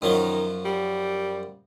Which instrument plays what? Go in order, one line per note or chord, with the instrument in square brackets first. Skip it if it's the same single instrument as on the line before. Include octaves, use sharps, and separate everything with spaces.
[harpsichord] F#2 F3 F#3 [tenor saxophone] D#3
[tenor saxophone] G3